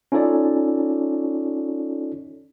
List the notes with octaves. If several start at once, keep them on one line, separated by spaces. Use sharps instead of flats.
C#4 D#4 F4 A4 C#5 D5